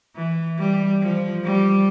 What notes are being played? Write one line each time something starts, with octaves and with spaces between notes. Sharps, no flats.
E3
G3
F3
G3